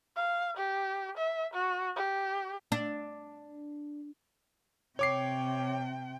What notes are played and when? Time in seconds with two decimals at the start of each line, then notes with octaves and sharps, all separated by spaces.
0.16 F5
0.57 G4
1.17 E5
1.54 F#4
1.96 G4
2.72 D4
4.99 C3 C#5 G5 D6 C7